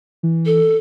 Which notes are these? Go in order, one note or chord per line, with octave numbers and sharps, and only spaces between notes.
E3
A4